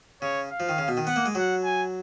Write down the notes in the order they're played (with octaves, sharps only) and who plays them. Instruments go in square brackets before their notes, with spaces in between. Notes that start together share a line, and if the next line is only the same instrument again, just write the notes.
[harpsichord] C#3 [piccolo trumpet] C#5
[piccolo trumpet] F5
[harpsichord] F3
D#3
C#3
B2
D#3
[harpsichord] B3 [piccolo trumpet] F#5
[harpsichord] A#3
G#3
[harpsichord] F#3 [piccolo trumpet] F#5
[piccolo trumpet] G#5